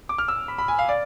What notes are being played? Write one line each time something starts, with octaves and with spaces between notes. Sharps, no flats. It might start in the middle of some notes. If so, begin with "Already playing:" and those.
D6
F6
E6
B5
B5
G#5
F5
D5